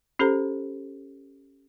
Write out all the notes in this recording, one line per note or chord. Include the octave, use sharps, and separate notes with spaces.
C#4 G4 A4 C5 A#5